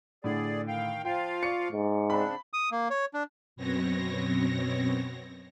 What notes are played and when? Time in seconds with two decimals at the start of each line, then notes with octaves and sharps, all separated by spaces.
0.24 A2 D3 G#4 D5
0.68 D#3 F5 G5
1.05 F3 F4 F5 G5
1.43 D5 C#6 C#7
1.72 G#2
2.10 C#3 C4 D4 B5
2.53 D#6
2.71 A#3
2.90 C#5
3.14 D4
3.56 F#2 B2 B3 C4 C#5 A#6